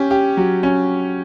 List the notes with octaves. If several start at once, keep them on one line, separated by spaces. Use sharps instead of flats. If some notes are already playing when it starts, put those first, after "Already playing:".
Already playing: C#4 G4
G4
F#3
C#4